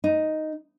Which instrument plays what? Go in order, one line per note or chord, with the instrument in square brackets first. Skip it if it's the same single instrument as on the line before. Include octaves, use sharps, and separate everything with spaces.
[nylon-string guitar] D#4